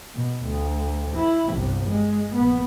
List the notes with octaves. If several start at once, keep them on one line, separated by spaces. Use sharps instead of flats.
B2
D2
E4
G1 C2
G#3
A#1 B3